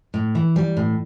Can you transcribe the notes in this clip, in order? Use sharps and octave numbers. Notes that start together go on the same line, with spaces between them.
A2
E3
G3
A2